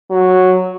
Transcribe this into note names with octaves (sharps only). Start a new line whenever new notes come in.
F#3